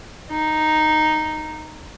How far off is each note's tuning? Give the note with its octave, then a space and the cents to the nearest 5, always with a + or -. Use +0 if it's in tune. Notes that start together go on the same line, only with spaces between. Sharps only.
D#4 -5